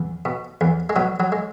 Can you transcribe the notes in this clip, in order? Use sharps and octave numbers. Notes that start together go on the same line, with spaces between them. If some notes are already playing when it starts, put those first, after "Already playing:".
Already playing: E2
B2
E2
G#3
B2 F#3
F#3
G#3